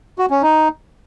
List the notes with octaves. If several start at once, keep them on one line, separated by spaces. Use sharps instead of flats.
F#4
C#4
D#4